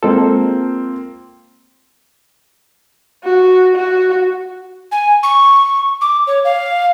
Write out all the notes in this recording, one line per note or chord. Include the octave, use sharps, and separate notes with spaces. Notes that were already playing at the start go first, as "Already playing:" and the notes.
G#3 A#3 C4 F4 A4
F#4
F#4
G#5
C#6
D6
C#5
F5